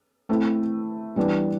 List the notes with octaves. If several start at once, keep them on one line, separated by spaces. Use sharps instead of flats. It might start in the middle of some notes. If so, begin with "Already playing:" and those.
A3 C4 E4
E3 G3 B3 D4